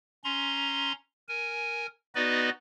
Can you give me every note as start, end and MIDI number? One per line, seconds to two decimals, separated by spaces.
0.24 0.92 61
0.24 0.92 82
0.24 0.92 84
1.29 1.87 70
1.29 1.87 80
2.15 2.49 59
2.15 2.49 63
2.15 2.49 66
2.15 2.49 71
2.15 2.49 74
2.15 2.49 75